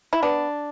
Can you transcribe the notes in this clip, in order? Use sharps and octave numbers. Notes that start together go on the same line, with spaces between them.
E4
B3 D4